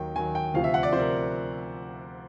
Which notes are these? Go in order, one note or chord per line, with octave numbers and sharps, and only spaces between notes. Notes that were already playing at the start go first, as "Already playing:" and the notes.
Already playing: D#2 D#3 F#3 G5
D#2 D#3 F#3 G#5
G5
D2 C3 F3 F5
E5
F#5
D5
C3 F3 C5
A#4